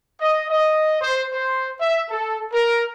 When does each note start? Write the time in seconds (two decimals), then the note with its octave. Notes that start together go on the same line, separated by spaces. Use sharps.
0.20 D#5
0.50 D#5
1.01 C5
1.32 C5
1.81 E5
2.10 A4
2.53 A#4